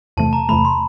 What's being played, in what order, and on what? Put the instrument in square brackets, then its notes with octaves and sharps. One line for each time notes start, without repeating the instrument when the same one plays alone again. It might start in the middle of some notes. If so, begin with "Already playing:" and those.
[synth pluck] E2 C3 E3 A3 [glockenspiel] A5
[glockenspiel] A#5
[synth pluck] E2 C3 E3 A3 [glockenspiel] B5
[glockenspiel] C6